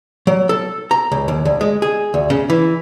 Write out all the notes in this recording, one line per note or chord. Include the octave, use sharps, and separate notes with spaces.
F#3
A4
A#5
C#2
D#2
D2
G#3
G#4
D2
C#3
E3